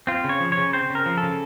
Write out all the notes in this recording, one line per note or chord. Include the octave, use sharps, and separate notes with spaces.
C4 F4
C#3
C#5
F3
C#5
C#3
C4 C5
C#3
A#4
F3
A4
C#3